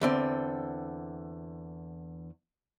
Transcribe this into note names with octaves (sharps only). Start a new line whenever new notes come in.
E2 D3 C4